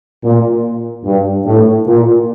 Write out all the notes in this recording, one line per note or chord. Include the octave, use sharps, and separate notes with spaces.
A#2
G2
A2
A#2